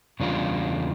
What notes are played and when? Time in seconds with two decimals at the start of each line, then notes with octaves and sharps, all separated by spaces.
0.20 E2 C#3 G3 D4 F4